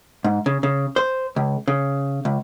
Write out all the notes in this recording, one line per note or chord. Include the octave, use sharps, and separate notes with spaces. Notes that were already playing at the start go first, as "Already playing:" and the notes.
G#2
C#3
C#3
C5
C#2
C#3
C#2